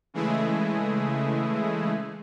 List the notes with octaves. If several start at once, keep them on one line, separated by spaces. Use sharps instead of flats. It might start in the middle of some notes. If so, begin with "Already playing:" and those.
C#3 E3 G#3 A3 E4 G#4